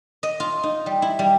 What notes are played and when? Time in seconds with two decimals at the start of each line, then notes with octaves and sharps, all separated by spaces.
0.23 D#5
0.40 F4
0.63 D#4
0.86 G3
1.02 E4
1.19 G3